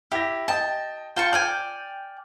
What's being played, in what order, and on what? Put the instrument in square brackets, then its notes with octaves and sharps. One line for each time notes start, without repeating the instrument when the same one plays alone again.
[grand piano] E4 A#6 [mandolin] G4
[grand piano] D#5 G5 [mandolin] A5
[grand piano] F4 [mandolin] G5 A5 C#6
[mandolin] D5 G5 G#5 [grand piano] F6